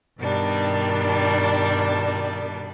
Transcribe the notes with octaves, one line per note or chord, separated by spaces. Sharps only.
G2 B2 D#3 G3 D4